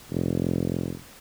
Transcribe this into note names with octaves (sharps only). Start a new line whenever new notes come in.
F1